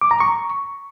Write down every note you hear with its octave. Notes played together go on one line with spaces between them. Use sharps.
D6
A#5
C#6